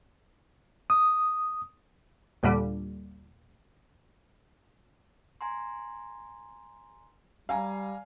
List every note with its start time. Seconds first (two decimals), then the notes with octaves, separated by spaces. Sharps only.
0.90 D#6
2.43 D#2 A#2 D3 G3
5.41 G#5 A#5 C6
7.49 G3 F5 G#5 A#5